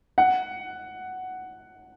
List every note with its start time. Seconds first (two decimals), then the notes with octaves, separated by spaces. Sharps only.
0.18 F#5